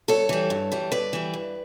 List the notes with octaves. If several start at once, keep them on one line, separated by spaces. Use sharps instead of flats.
G2 A4 C#5
E3 G3
G2
E3 G3
G2 B4 D5
E3 G3
G2